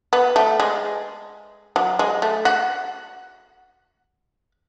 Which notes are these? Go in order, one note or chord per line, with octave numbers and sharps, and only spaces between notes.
B3
A3
G#3
F#3
G#3
A3
F#4